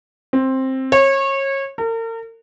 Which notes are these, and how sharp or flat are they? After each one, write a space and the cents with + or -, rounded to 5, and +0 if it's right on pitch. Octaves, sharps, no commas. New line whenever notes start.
C4 +10
C#5 -25
A#4 -40